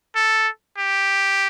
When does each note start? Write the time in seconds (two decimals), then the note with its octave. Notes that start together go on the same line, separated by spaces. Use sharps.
0.16 A4
0.78 G4